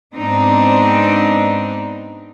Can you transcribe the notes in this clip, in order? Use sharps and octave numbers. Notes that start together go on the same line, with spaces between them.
G#2 B3 C4 D4 D#4